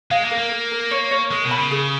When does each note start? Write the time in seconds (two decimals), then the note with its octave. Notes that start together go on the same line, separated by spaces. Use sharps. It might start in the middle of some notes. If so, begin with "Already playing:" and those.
0.11 G#3 F5
0.25 A#3
0.31 A#4
0.38 A#3
0.52 A#4
0.72 A#4
0.91 C#5
1.11 C#5
1.31 G#3 A#4
1.44 B2
1.51 B5
1.58 C#3
1.71 G#4